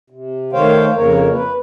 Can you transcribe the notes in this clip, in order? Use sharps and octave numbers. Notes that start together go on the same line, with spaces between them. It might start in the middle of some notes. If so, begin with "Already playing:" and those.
C3
D#3 A3 C5 C#5 F5 G5
F2 C#3 A#3 A#4 C#5
B4